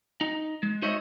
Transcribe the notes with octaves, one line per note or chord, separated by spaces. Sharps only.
D#4
G#3
D#4 F#4 C5 C#5 D#5 E5